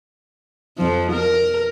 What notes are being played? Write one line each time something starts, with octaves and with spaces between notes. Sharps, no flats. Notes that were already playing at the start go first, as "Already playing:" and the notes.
F2 F3
A#4